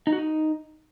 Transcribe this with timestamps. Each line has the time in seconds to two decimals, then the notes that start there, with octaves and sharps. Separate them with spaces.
0.07 D#4
0.12 F#4
0.18 D#4